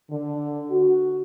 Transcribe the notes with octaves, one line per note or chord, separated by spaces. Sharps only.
D3
F#4